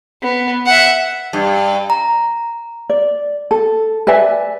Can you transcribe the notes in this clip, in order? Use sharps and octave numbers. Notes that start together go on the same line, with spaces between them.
B3
E5 F#5
G2
A#5
D5
A4
B4 D5 E5 G#5